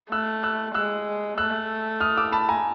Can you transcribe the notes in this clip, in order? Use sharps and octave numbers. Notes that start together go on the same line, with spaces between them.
A3 E6 F#6
E6 F#6
G#3 E6 F#6
A3 E6 F#6
D#6 F6
D6 E6
A5 B5
G#5 A#5